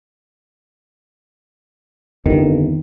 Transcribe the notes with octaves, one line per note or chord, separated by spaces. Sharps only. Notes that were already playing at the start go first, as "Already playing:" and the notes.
G1 F2 D3 D#3 C4